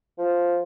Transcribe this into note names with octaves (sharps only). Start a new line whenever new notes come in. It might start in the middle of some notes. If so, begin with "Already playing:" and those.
F3